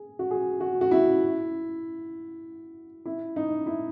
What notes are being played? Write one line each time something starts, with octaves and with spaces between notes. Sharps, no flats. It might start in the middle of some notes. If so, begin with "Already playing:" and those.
Already playing: G#4
F#4
G#4
F#4
F#4
E4
E4
D#4
E4